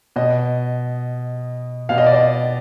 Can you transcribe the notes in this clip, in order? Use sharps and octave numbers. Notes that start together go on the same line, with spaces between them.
B2 D#5
B2 F5
D#5
D5
D#5